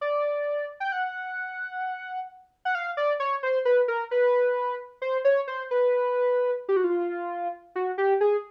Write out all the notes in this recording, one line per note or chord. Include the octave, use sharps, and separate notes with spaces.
D5
G5
F#5
F#5
F5
D5
C#5
C5
B4
A#4
B4
C5
C#5
C5
B4
G4
F#4
F4
F#4
G4
G#4